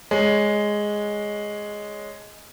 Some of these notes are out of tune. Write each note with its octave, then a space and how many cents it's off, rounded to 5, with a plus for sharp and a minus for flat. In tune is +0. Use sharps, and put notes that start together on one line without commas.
G#3 +0 C#5 +0